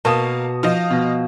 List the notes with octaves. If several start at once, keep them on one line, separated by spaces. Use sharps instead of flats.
B2 A#3 F5 A5 D#6 E7
F3 F4 D#5
B2